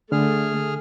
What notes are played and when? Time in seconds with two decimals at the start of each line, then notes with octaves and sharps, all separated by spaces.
0.12 D3 A3 G#4 F6